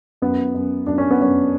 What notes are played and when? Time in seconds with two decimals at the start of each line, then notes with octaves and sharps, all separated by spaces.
0.22 F#2 B3
0.54 F#2
0.87 F#2 D4
0.98 C#4
1.11 B3
1.20 F#2 C#4